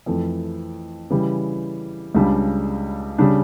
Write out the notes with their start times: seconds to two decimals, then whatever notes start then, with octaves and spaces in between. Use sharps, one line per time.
0.06 F2 E3 A3
1.10 C#3 E3 G3
2.15 C#2 C#3 G3 D4
3.18 C#3 G3 D4